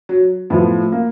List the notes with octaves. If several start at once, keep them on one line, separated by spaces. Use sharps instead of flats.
F#3
A2 F3 B3
A#3